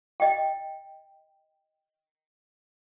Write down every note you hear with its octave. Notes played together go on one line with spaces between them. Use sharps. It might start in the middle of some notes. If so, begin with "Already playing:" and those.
D#5 G5